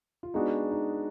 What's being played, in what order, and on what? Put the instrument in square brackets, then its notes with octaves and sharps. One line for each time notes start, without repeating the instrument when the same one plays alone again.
[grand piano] F4
[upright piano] G#3 B3 D4 F#4 [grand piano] D#4
[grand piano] D#4